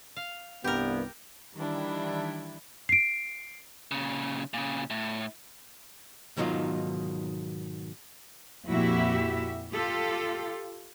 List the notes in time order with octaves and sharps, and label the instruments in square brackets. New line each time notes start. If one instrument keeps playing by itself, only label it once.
[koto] F5
[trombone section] C2 G2 B3 [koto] G4 A#4
[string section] D#3 E3 G3 D4 E4
[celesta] C7 D7
[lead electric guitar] A#2 C#3
A#2 C#3
A2
[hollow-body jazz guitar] G#2 B2 D#3 F#3 D#4 F4
[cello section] F2 A#2 E4 F#4 G4 E5
F4 G4 A4